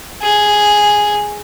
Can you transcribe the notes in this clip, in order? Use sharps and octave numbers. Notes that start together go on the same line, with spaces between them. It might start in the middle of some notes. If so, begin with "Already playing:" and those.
G#4